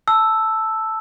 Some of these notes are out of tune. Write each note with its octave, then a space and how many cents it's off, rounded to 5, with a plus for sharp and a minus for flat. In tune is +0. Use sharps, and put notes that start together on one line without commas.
A5 +0 E6 +0